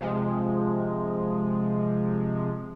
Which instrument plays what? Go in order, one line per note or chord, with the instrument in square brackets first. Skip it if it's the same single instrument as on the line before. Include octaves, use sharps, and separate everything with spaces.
[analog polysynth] C3 F3 G#3